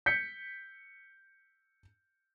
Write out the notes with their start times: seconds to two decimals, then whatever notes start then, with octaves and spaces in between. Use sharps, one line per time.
0.06 G6 B6 C#7